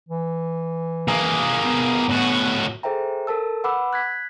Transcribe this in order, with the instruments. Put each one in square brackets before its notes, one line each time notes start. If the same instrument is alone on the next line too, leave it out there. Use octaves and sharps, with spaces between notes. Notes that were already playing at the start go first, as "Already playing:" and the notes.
[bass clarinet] E3
[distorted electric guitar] A#3 G#4
[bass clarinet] B3
[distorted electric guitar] A2 F#4
[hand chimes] G#4 A4 C5 E5 G5 A#5
A4 A#4 A5 E6
B4 F#5 B5 D6 E6
F#6 G#6 B6